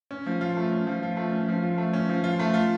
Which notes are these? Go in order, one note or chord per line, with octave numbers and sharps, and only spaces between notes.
C#4
F3
F4
A3
C#4
F3
F4
A3
C#4
F3
F4
A3
C#4
F3
F4
A3
F4